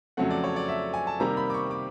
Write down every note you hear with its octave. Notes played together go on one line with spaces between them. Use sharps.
F2 C#3 F#3 A3 F#5
D5
C#5
D5
E5
G#5
A5
C3 D#3 G3 A#3 A#5
B5
D6
C#6
D6